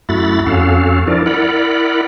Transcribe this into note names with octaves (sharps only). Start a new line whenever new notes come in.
F#2 A3 E4 F#4 B5 A6
F2 C#4 F#4 A4 F5
F3 D4 E4 A#4 D5
E4 A#4 D5 F#5 B5